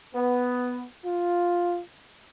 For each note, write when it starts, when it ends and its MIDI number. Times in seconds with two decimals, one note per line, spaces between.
0.15 0.82 59
1.04 1.80 65